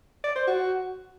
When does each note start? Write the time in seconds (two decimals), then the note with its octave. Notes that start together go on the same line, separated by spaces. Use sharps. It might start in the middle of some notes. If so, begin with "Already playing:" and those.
0.24 D5
0.35 C5
0.47 F#4